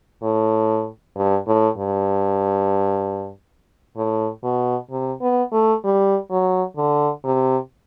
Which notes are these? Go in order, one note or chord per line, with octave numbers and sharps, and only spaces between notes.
A2
G2
A2
G2
A2
B2
C3
B3
A3
G3
F#3
D3
C3